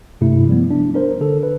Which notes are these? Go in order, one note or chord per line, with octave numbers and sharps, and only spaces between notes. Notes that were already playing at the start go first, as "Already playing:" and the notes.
G2 C3 A3 E4
F3 G3 B3
D4
D4 A#4 C5
D3 A4
B4